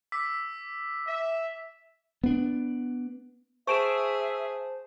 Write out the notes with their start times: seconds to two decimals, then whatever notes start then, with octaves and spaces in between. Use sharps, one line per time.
0.12 D6 E6 B6
1.07 E5
2.24 B3 D4
3.67 G#4 C5 E5 A5 C#6 D7 E7